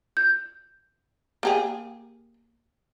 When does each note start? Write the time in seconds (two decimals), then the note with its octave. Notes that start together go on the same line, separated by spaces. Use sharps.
0.17 G6
1.43 A#3 G4 G#4